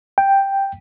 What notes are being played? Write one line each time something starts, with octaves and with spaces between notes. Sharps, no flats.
G5